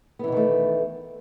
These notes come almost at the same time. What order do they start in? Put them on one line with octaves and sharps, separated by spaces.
B3 E3 B2 D#3 A3